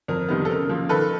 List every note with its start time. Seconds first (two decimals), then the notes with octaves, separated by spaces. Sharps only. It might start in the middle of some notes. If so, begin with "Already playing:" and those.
0.08 F2 A#4
0.29 C3 D#3 G3 B3
0.45 A4
0.49 C#3 A#4
0.69 F3 A#3
0.89 D#3 A4 B4